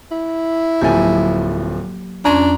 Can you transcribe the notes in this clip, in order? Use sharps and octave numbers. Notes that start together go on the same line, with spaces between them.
E4
D1 F3 F#3 A#3 G4 G#5
F2 C#4 D4 A#5 C6